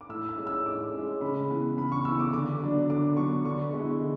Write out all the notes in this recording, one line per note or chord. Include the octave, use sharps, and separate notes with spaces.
D6
A2 E6
E6
G#3 C#4
E6
A2 D6
C#4
G#3
C#3 B5
E3 B3
C#3 B5
C#6
E3 B3 E6
D6
D3 D6
F#3 B3 D4
D3 D6
F#3 B3 D4 C#6
D3 C#6
G#3 B3 E4
D3